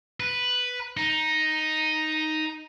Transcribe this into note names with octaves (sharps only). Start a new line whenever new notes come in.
B4
D#4